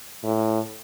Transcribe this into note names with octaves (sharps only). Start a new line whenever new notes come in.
A2